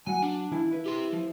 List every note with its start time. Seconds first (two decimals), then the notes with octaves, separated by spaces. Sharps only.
0.07 F#3 F#5 G#5
0.23 D4
0.51 E3 E4 F4
0.71 E4 B4
0.86 G4 C6
1.13 F3